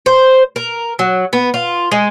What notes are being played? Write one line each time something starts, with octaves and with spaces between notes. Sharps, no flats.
C5
A#4
F#3
B3
F4
G#3